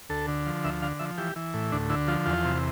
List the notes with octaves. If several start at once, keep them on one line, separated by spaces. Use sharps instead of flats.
D2 A4
D3
F3
D2 E5
D3 F5
F3 E5
E3 G4
E3
A2
D2 D4
D3 E4
F3 F4
E2 F4
C3